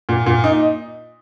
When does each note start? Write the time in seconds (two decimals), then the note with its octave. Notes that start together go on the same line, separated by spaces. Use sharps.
0.09 A#2
0.26 A#2
0.44 D#4